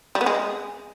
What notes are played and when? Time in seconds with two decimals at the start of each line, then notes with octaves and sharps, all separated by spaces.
0.15 G3
0.21 B3
0.26 G#3